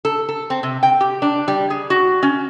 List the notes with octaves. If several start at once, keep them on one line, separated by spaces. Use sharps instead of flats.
A4
A4
C4
C3
G5
G4
D4
G3
G#4
F#4
C#4